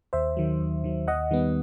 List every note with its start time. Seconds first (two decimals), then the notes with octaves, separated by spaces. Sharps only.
0.13 D#2 C5 E5
0.37 D#3 F#3
0.60 D#2
0.84 D#3 F#3
1.08 D#2 D#5 F#5
1.31 D#3 G3 B3